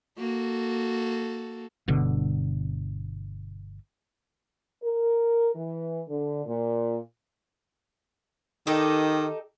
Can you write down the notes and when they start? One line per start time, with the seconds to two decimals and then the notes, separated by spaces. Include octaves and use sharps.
0.18 A#3 F#4 A4
1.88 G1 B2 D3
4.83 A#4
5.55 E3
6.09 D3
6.45 A#2
8.67 D#3 D#4 G4 A4